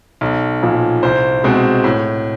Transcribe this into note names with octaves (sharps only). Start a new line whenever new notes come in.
B1
A#2 F3
C2 C5
B2 G#3 C4
A2